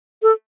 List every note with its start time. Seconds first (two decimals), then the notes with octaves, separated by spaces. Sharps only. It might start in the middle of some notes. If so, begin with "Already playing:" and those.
0.23 A4